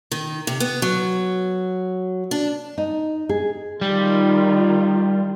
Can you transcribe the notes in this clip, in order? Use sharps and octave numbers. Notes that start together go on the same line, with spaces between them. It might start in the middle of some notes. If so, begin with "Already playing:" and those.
D#3
C3
B3
F#3
D4
D#4
G#4
D#3 G3 F4